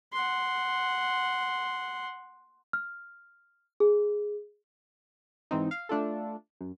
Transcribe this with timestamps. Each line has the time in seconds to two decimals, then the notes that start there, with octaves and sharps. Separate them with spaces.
0.13 F#5 C6
2.73 F6
3.80 G#4
5.51 G#2 E3 C4 D#4
5.71 F5
5.89 A3 D4 F4 A4
6.61 F#2